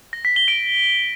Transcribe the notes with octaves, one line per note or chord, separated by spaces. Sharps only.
A#6
B6
G7
D7